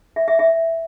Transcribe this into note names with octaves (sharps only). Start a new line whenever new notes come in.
E5
E5
E5